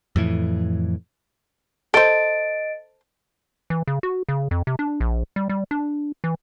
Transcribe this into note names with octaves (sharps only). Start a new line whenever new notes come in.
F2 A2 E3
A4 C5 D#5 A6 D7
E3
C#3
F#4
C#3
F2
C3
D4
A#1
G3
G3
D4
E3